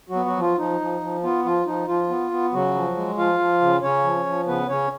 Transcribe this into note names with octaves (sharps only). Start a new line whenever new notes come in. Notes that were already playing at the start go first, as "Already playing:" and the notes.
F#3 F#4
B3
F#3 F#4
F3
F4
F3 D#4
F3
F3
B3 F4
F3 F4
F3 D#4
F3 F4
B3
B3
C#3 F#3 F#4
F3
G#3
F3 F4 F5
F3
C#3
C#3 C#4 C#5
F3
F3
C#3 B3 B4
C#3 C#4 C#5